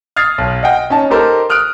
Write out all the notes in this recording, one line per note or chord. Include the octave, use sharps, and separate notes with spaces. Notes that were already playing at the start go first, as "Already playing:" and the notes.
D#6 F6 G#6 A6 C7
B1
D#5 F#5 G5
C#4 D#4 A5
D#4 G4 A4 A#4 C5
D#6 F6 F#6 D7